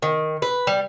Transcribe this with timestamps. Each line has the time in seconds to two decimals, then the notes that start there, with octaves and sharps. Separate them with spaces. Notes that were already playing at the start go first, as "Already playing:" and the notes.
0.02 D#3
0.42 B4
0.67 G3